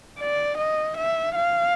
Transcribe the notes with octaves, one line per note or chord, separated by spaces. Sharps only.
D5
D#5
E5
F5